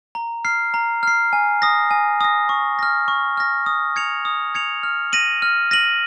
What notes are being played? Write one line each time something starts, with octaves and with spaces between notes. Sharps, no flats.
A#5
F6 C7
A#5
F6 C7
G#5
D#6 A#6
G#5
D#6 A#6
C#6
F6 A#6
C#6
F6 A#6
D#6
G#6 C#7 F7
D#6
G#6 C#7 F7
F6
A#6 D#7 F#7
F6
A#6 D#7 F#7